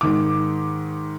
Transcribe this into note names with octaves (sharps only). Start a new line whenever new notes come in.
G#2 D#3 D6